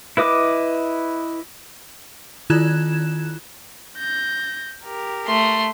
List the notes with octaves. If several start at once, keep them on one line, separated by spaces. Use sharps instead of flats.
E4 B4 D#5 D6
D#3 E4 F4 F#6 G#6 E7
G6 A#6
G4 A#4
A3 C6